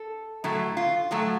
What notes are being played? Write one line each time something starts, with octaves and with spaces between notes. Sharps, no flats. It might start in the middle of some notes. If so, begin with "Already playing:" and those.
Already playing: A4
A2 F#3 A3 E4
F4
A2 F#3 A3 F#4